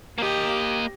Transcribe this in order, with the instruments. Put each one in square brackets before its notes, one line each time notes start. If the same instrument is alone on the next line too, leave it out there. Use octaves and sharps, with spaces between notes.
[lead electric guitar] A#3 D#5 [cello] G4